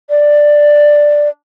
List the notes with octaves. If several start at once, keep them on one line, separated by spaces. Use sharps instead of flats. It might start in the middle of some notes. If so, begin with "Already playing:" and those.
D5